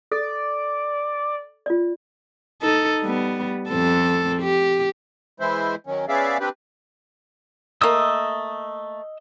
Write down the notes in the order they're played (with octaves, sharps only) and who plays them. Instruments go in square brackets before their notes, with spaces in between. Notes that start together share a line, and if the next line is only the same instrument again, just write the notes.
[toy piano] A4 [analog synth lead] D5
[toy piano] F4 D5
[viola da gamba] D#4 A4
G3 B3
F2 C4 A4
G4
[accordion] E3 G#3 E4 C5
D#3 F#3 C#4
B3 C#4 G#4 D5 E5 F5
C4 D4 G4 B4
[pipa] A3 A#3 [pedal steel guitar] D#5 D#6 E6